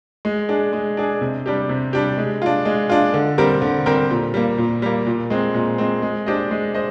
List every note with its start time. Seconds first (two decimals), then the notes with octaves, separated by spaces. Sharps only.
0.25 G#3
0.49 D4 G#4
0.73 G#3
0.97 D4 G#4
1.21 C3
1.46 G3 D4 G4
1.69 C3
1.93 G3 D4 G4
2.18 G#3
2.42 D4 F4
2.65 G#3
2.90 D4 F4
3.14 D3
3.38 G3 C4 G4 A#4
3.62 D3
3.86 G3 C4 G4 A#4
4.10 A#2
4.34 G3 A#3
4.58 A#2
4.82 G3 A#3
5.07 A#2
5.30 G#3 C4
5.54 A#2
5.78 G#3 C4
6.02 G#3
6.26 D4 G4 C5 D#5
6.51 G#3
6.74 C5 D#5